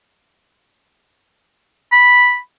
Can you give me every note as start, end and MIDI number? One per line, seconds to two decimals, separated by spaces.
1.92 2.38 83